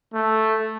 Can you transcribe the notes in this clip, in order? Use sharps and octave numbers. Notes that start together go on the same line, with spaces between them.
A3